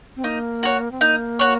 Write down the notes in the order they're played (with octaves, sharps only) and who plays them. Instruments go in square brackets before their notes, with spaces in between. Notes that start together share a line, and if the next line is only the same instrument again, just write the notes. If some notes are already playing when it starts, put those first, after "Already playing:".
[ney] C4
[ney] A#3 [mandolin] D#4
[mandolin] F#4 C#5
[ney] C4
[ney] A#3 [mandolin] D#4
[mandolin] F#4 C#5